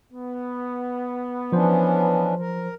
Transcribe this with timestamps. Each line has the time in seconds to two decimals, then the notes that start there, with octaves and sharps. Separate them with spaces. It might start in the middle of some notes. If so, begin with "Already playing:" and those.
0.11 B3
1.52 E3 F3 C#4 D4 C5
2.39 A#4